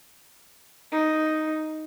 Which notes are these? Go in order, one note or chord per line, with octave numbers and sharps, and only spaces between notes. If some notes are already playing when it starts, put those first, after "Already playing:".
D#4